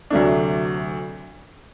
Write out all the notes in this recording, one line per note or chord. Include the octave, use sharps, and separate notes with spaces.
D2 C3 F#3 A3 D4